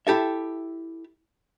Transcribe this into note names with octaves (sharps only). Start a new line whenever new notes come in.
E4 G4 A4 E5